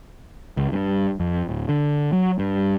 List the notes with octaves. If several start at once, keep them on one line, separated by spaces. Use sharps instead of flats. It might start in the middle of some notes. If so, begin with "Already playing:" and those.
C#2
G2
F2
D1
D3
F#3
G2